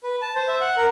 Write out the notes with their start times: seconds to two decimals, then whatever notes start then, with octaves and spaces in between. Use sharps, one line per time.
0.04 B4
0.22 A5
0.36 C5
0.48 E5
0.61 F#5
0.77 A#4